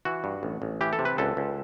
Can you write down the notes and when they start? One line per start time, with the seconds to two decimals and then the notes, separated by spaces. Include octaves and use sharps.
0.05 E3 F#4
0.24 G2
0.43 A1
0.62 A1
0.81 E3 G4
0.93 A4
0.99 C3
1.05 B4
1.18 C#2 A4
1.37 C#2